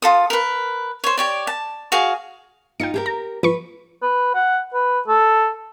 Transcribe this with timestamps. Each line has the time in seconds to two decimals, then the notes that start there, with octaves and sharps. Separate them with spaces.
0.02 F4 A4 D#6
0.30 A#4 B4
1.04 C5 C#5
1.17 G4 C#5 D5
1.47 A5
1.92 F#4 G#4 F5
2.80 D#4 F4 G5 C#7
2.94 G4 G#4 A#4
3.06 A#5
3.43 F3 B4 C#6
4.02 B4
4.34 F#5
4.74 B4
5.08 A4